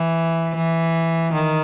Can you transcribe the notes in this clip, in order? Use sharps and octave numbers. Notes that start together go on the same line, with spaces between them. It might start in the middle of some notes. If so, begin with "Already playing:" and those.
Already playing: E3
E3
D#3